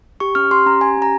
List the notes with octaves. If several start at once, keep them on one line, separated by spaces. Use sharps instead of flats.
G4 C#6
C#4 F6
G4 C6
C#4 A#5
G4 G#5
C#4 A#5